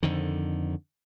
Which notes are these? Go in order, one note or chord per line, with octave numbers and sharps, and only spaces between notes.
F2 D3 D#3